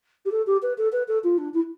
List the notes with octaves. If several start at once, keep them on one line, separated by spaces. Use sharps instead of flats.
G4
A4
G4
B4
A4
B4
A4
F4
D4
E4